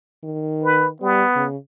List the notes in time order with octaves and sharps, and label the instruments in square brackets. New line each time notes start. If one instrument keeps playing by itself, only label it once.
[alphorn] D#3
[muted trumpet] B4
[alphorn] G3 [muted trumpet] B3
[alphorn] C#3